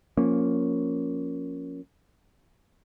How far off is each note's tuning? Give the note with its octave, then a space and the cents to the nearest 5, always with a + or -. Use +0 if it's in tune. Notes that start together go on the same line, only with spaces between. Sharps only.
F3 +15 A#3 +0 C#4 +0